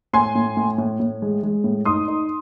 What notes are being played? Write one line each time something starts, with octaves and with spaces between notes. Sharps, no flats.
A2 G#5 C6
A2
A2
A2
A2
G#3
G#3
A2
D#4 C6 D#6
D#4